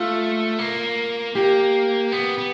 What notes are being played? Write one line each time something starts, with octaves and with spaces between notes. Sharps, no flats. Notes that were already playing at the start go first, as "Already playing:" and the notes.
Already playing: A3 F4
A#3
A#3 G4
B3
B3